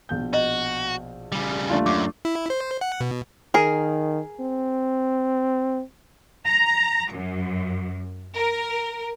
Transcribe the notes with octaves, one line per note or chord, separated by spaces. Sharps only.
A#1 B2 G6
F#4 D#5
C#3 G3
D#2 A3 D4 F4
F#2 D6
E4
C5
F#5
B2
D#3 G#4 A#4
C4
A#5
F#2
A#4